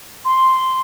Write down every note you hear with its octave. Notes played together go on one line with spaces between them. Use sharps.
C6